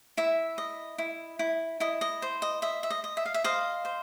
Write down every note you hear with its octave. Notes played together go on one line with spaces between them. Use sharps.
E4 E5
D#5
E4
E4
E4 D#5
D#5
C5
D#5
D#5 E5
E5
D#5
D#5
E5
F5
E5
C5 D#5 F5
C5